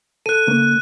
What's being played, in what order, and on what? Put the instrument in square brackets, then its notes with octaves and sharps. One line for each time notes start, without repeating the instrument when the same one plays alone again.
[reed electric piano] A4 [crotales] F#6 D#7
[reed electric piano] C#3 A3 A#3